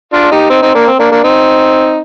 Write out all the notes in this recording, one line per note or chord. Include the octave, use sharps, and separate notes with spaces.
D4 F4
D#4 G4
C4 D#4
C4 D#4
A#3 D4
C4
A#3 D4
A#3 D4
C4 D#4